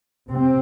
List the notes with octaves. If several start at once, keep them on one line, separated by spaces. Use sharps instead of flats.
C3 C4